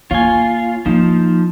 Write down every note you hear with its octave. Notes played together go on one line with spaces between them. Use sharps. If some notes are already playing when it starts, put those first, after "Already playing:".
A#3 F4 C#5 G#5
F3 A#3 D#4